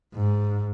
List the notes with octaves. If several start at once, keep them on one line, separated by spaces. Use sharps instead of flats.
G#2